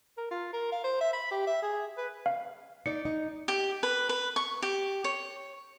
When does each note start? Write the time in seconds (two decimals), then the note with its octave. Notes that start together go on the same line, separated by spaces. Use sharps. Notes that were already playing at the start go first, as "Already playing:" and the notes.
0.17 A#4
0.31 F4
0.53 A#4
0.72 F5
0.84 C5
1.01 E5
1.13 B5
1.31 G4
1.47 E5
1.62 G#4
1.97 B4
2.26 F5
2.86 D#4 D5 C#7
3.05 D#4
3.48 G4
3.83 B4
4.09 B4
4.36 C#6
4.62 G4
5.04 C#5